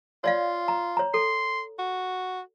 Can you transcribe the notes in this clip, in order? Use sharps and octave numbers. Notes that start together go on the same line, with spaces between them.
F4 C#5 D5 F5
A#5
C#5 A#5
A4 C6
F#4